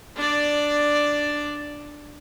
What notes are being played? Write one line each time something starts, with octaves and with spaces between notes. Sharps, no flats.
D4 D5